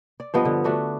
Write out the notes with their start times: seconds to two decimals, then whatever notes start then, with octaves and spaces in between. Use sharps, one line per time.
0.20 D5
0.34 G2 F3 B3 D#5
0.45 D3
0.64 A3 D4 F#4 B4